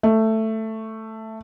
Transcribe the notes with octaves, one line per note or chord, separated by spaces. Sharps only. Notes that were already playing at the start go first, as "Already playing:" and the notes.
A3